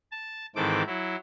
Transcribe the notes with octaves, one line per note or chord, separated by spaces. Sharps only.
A5
G#2 D#3 E3 C4 A4 D6
F#3 E4